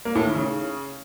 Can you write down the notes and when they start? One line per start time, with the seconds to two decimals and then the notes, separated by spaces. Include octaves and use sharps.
0.05 A#3
0.15 A2
0.25 D#3
0.35 C#3